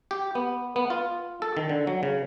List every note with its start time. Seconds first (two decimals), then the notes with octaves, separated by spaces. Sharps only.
0.11 G4
0.35 B3
0.76 B3
0.90 F4
1.42 A4
1.57 D#3
1.69 D3
1.87 F#3
2.03 C#3